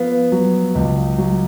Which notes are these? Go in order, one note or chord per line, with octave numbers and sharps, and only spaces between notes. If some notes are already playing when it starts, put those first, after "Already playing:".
Already playing: F3 B3 F5
F#3
C#2
F#3